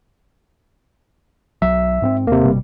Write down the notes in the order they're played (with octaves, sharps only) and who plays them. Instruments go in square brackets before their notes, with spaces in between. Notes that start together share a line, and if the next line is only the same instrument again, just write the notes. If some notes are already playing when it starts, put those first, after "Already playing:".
[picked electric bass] B1 F#3 [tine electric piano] E5
[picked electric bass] G#2 B3 C4
[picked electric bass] D#2 [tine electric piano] C3 A#3
[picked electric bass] G1 B2 G3